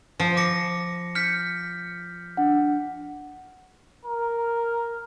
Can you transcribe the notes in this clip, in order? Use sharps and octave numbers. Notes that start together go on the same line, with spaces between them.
F3
D6 A#6 C#7
F6 G6 B6 C#7
D4 F#5
A#4